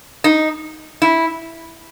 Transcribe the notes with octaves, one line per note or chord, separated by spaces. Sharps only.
D#4
E4